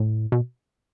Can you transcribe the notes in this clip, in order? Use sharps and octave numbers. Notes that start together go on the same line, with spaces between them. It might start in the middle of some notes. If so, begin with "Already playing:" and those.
Already playing: A2
B2